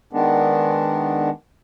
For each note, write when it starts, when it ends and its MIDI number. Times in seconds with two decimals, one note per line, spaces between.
0.13 1.30 51
0.13 1.30 56
0.13 1.30 59
0.13 1.30 62